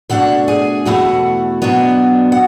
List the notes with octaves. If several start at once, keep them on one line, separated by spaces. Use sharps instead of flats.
B2 A3 D4 F#4 F#5
G#4 G#5
E2 B2 A3 E4 F#4 F#5
B2 F#3 B3 D4
F#5